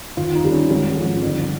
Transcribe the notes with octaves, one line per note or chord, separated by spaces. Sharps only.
D#2 F4
D#4
D#3 G3
C#4
G#1
G#2 F3
G1